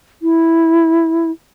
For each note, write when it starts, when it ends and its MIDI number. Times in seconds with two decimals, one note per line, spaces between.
0.22 1.31 64